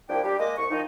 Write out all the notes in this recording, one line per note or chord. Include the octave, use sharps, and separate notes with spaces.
C2 F3 A#3 D4 E4 G5
G3 D4 G4
G#3 A#3 D#5 D6
C2 C#6
D#3 F3 D#4